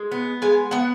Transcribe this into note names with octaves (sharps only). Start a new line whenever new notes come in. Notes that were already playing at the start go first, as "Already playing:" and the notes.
Already playing: G#3
B3
G#3 G#5
B3 F#5